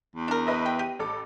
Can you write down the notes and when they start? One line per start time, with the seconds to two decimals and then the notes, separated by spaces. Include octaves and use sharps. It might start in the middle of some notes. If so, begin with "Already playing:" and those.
0.15 E2
0.28 D4 A#4
0.47 B4 D#5 E5
0.66 G5
0.79 G4 D#7
0.99 A1 A4 D6